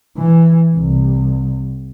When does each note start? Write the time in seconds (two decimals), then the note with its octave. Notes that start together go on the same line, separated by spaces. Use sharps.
0.18 E3
0.76 C2